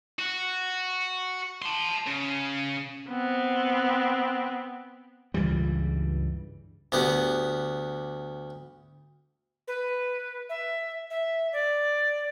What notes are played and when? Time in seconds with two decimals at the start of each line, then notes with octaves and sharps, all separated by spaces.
0.19 F#4
1.62 A5 C6
2.07 C#3
3.10 B3 C4
5.34 C#2 G2 E3 G3
6.92 D2 B3 G4
9.68 B4
10.49 E5
11.10 E5
11.53 D5